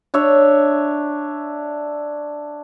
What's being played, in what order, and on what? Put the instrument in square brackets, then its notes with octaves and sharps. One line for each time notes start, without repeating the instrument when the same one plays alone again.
[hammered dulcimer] D4 C#5 E5